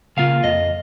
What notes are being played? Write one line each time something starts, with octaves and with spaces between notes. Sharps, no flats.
C#3 A#3 F4 F5
F2 D#5